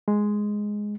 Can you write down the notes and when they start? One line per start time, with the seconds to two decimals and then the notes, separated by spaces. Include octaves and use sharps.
0.08 G#3